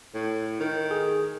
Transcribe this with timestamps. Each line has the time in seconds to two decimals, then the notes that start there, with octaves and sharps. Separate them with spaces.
0.14 A2
0.61 D#3
0.91 G#4